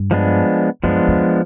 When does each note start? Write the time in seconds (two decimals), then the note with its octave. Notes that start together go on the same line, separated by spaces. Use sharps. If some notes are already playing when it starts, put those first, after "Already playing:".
Already playing: G2
0.11 F3 G#3 B3 D4
0.83 F#2 F3 G#3 B3 D4
1.08 E2